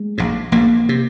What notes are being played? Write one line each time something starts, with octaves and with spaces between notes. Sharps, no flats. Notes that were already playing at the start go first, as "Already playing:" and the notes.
Already playing: G#3
A#1 G#2
A#1 G#2 A#3
C3